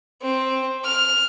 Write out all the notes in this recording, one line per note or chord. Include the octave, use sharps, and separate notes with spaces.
C4
F6